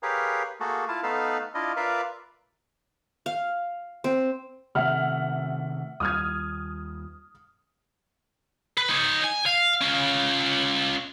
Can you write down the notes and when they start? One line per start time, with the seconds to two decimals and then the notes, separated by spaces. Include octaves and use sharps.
0.03 G4 G#4 A#4 B4 C#5 F5
0.60 A3 A#3 F#4 G#4 A4
0.88 E4 F4 A5
1.03 A3 B3 D#4 A4 B4 F5
1.55 D4 E4 F4 D#5
1.76 F4 A#4 B4 D5 E5 F5
3.26 F5
4.04 C4
4.75 C3 D#3 A3 E5 F#5 F6
6.00 D#2 G3 D#6 F6 G#6
8.78 B4
8.89 D#4 C#5
9.24 G#5
9.46 F5
9.82 C#4 F4